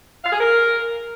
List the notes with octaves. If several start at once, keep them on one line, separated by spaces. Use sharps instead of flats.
F5
G#4
A#4